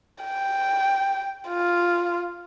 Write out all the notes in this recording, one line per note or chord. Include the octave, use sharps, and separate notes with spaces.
G5
F4